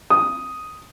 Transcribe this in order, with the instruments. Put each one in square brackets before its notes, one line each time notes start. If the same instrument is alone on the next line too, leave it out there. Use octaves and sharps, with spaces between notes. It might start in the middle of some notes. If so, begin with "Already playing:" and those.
[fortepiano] D#6